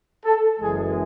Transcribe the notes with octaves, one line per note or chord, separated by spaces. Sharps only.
A4
F#1 F#2 E3 G#3 G#4